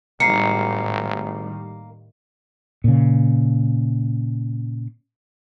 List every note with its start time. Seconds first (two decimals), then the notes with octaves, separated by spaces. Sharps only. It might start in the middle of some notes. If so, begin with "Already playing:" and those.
0.20 G#1 A2 D#3 G3 A#3 C7 C#7
2.84 A#2 C#3